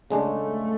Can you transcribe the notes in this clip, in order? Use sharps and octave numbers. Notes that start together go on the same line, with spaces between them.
C#3 G#3 A3 D4